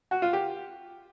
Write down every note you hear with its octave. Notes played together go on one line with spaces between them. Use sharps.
F#4
F4
G4